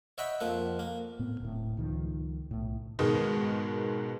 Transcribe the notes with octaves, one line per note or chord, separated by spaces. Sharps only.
C#5 D#5 E5 F#5 G5 B5
F2 F3 A#3 F#5
A#3
A2 B3 C4
D1 A2
C#2 D#3 F3
B1 A2
G#2 B2 D#3 G#3